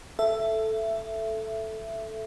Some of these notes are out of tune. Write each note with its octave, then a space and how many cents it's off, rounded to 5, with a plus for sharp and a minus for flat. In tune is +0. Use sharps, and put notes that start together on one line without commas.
A4 +0 E5 +15